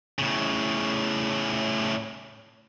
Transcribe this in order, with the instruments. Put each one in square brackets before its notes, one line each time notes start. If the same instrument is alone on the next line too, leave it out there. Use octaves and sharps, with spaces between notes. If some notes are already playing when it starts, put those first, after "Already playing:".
[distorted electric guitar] A2 C#3